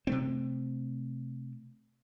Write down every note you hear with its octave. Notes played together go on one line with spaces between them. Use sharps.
C3 A3 C4